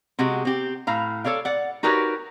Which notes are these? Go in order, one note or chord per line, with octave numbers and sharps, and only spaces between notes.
C3 G#3 F#4 G4
C4 G4
A2 F5 A#5
A4 C#5 D5 F5
D5 F#5
D#4 F#4 G4 A#4 B4 C#5